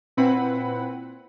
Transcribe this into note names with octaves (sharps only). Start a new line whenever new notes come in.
A#2 C4 E4 B4 F#5 B5